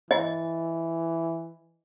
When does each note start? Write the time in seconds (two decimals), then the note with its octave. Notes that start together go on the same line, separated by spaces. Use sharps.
0.11 E3 D#5